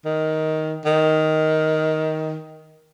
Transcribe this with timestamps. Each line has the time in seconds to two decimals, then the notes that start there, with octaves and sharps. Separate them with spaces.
0.05 D#3
0.85 D#3